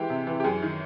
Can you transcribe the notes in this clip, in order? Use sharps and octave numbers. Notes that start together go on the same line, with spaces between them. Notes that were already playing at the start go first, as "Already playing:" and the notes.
Already playing: E3 G#3 G4
C3
E3
G4
F#2 G#4
D#3